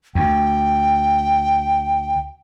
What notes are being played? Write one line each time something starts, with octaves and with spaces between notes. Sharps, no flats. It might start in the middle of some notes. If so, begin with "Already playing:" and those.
D2 G5